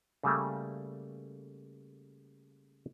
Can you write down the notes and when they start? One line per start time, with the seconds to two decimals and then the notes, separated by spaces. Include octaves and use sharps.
0.23 C#3 G3 A3 A#3